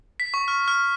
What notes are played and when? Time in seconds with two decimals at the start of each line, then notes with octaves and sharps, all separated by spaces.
0.20 B6
0.34 C#6
0.48 F6
0.68 F6